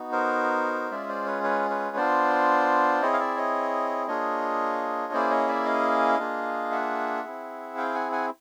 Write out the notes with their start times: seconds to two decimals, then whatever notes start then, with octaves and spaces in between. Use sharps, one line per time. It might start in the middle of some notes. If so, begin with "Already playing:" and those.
Already playing: B3 D#4 F#4
0.12 A#4 C5
0.91 G#3 C#4 F4 G#4 D5 E5
1.09 C5 D5
1.26 B4 C#5
1.44 B4 C#5
1.70 B4 C#5
1.97 B3 D4 F4 C5 D5
3.02 C4 E4 G#4 C#5 D#5
3.13 F5
3.20 D5 E5
3.37 C#5 D#5
4.07 A#3 D4 F4 G#4 C#5 D#5
5.13 A#3 C#4 E4 G#4 C5 D5
5.31 C#5 D#5
5.48 D5 E5
5.66 D#5 F5
6.19 A#3 D4 F4 G#4
6.71 E5 F#5
7.24 C4 E4 G#4
7.77 F5 G5
7.95 F#5 G#5
8.12 F#5 G#5